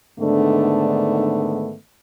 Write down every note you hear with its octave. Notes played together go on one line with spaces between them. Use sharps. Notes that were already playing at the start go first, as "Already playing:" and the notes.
G#2 D3 D#3 A3 B3 D4